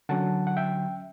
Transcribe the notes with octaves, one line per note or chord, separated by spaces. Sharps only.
D3 F#3 C#4 F#5 A5
F#5
E5 G5